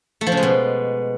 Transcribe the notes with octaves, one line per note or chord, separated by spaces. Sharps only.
A3
F3
C#3
G#3
B2